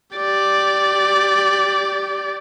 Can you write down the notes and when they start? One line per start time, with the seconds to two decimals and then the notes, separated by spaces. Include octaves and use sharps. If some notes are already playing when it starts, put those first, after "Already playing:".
0.16 G4 D5